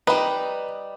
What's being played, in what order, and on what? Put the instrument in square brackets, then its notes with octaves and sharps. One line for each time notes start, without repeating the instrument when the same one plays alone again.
[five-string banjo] G3 D#4 [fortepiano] B4